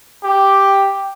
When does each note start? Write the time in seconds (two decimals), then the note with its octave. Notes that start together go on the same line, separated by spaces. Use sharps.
0.23 G4